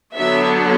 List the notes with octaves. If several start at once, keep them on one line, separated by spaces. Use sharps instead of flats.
D3 F#3 B3 D4 E5